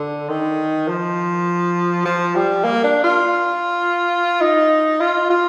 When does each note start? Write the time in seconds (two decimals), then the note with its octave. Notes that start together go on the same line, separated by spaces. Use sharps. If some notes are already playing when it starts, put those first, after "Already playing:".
Already playing: D3
0.29 D#3
0.88 F3
2.05 F3
2.35 G3
2.64 A#3
2.84 D4
3.04 F4
4.41 D#4
5.00 F4
5.30 F4